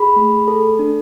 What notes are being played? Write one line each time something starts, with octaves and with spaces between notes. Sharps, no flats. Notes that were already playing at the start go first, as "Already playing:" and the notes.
Already playing: G#4 B5
A3
A4
D4